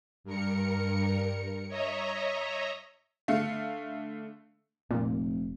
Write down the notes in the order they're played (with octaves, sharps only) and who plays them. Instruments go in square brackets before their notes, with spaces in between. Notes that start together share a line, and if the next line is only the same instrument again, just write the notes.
[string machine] G2 A#4 C#7
C#5 D#5 E5 A#5
[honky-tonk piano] D3 A3 F5 C#7
[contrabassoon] F1 [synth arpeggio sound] A#2